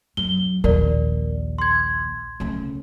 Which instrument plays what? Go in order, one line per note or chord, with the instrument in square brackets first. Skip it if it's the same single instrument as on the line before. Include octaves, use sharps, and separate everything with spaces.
[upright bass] F#2 F#3 [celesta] G7
[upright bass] A#1 D#2 [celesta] A#4 D5
[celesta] C6 G#6
[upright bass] D2 C#3